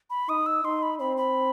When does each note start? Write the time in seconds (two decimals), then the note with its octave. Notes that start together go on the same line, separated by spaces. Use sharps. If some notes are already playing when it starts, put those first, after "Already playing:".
0.10 B5
0.28 D#4 D#6
0.46 E6
0.64 D#4 C6
0.82 B5
0.99 C4 B5
1.17 B5